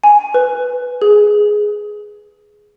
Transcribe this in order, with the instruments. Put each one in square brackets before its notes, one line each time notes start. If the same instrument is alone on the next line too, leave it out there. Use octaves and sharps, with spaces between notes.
[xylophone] G#5
B4
G#4